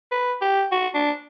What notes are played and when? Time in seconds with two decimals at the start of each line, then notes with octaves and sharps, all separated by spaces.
0.11 B4
0.41 G4
0.72 F#4
0.95 D4